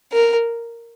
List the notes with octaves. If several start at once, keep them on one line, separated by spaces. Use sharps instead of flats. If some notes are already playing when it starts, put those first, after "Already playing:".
A#4